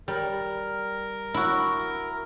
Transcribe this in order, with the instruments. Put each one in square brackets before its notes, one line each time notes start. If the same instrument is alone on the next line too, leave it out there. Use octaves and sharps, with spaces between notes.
[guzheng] G3 [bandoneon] A#4
[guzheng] E4 F#4